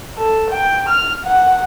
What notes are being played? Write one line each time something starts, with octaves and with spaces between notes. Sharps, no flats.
A4
G5
F6
F#5